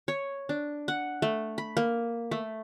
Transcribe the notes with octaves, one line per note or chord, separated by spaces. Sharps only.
C#5
D4
F#5
A3
B5
A#3
A3